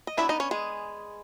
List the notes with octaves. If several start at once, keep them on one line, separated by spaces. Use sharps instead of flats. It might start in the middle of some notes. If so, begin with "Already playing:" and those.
D#5
F#3 B3 D4 E4 E5
D#4 D#5
C#4 C#5
G#3 G#4